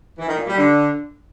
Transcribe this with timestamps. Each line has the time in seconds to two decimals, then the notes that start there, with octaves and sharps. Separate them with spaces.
0.18 E3
0.28 D#3
0.38 A#2
0.47 G3
0.57 D3